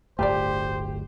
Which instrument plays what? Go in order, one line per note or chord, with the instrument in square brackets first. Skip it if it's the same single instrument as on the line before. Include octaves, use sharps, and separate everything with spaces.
[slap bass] D1 G1 A3 [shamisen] F4 D5 [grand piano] G4 [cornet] C5